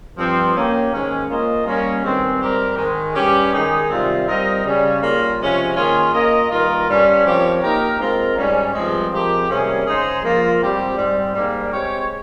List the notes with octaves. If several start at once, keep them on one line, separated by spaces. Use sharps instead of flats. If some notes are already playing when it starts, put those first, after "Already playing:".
G2 F3 C4
A#3 C#4 G4
G#2 D#3 G#3 C#4
A#3 C#4 F4 C5 D#5
G3 A#3 C#4
G2 D#3 G#3 C4
G#2 G3 C4 G4 A#4
G#2 D#3 G#3
G2 G3 C#4 G4
D#3 G#3 D#4 G#4
C3 D#3 G3 C4 F4
G3 C4 D#4 A#4 D#5
C#3 G3 C#4
C#3 G3 A#3 F4
C3 F3 G#3 C#4 F4
D#3 A#3 C#4 F4 G#4
A#3 F4 A#4 D#5
G2 D#3 A#3 F4 A#4
G2 G3 C#4
F3 C4 G4 A#4 C#5
A#3 D#4 G4 A#4
G#3 C4 F4 A#4
G#2 G3 C#4
G2 F3 G#3 C4
F3 G#3 C4 G4 A#4
C3 G3 A#3 C#4 G#4
C#3 G#3 D#4 G#4 C5
F3 A#3 F4
G#2 G3 C4 G4
G#2 G3 C4
G#2 G3 A#3
G#3 C4 G4 C#5